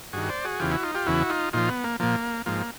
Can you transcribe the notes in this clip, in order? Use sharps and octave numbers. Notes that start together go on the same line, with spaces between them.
G2 D#3 F#4 G#4
C5 D5
F#4 G#4
E2 C#3 E3 F4 G4
E4 F#4
D#4 F4
F4 G4
E2 C#3 E3 E4 F#4
D#4 F4
A#2 F3 D#4 F4
B3
A#3
A#2 F3 A#3
G#2 F3 A#3